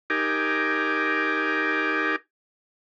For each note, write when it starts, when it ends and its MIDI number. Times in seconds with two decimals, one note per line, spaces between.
0.10 2.16 63
0.10 2.16 67
0.10 2.16 70
0.10 2.16 80
0.10 2.16 86